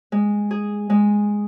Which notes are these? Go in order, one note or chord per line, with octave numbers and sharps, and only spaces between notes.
G#3
G#4
G#3